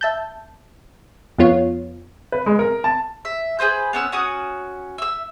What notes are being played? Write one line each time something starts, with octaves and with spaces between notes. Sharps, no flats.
E5 A5 G6
F2 B3 F4 C#5
B4
G#3
A#4
A5
E5
G#4 B4 C5 G6
B3 C#4 E6 F#6
C#4 F#4 D#6 F#6
E5 E6